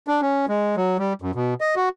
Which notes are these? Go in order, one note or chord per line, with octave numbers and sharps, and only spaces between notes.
D4
C#4
G#3
F#3
G3
F#2
B2
D#5
F#4